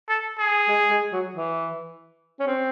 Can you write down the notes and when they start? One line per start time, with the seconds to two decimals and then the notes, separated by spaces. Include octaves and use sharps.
0.09 A4
0.38 G#4
0.68 G#3
0.90 G#3
1.13 F#3
1.36 E3
2.40 C#4
2.47 C4